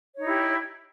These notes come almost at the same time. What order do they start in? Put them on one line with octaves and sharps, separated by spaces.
C#5 D#4 E4 G4